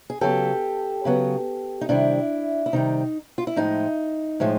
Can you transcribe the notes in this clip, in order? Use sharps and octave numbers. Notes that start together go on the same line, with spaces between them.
G#4
C#3 F#3 B3 G4 A4
C#3 F#3 B3
D#4
C3 D#3 G3 D4 E4
E4
C3 D#3 G3 D#4
F4
E4
A2 F3 G#3 D#4
A2 F3 G#3